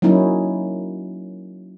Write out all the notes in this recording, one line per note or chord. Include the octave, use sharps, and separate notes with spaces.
F#3 A#3 C#4 D#4 E4